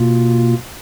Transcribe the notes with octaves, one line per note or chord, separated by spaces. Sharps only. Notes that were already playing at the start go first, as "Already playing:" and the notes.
Already playing: B2 A#3 F4